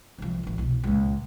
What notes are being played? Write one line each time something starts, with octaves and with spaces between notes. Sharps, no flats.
C2 F3
A1 E3
C2 B2
C#2 A#2